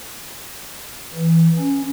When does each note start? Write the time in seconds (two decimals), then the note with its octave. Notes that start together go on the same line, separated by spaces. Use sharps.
1.14 E3
1.57 C#4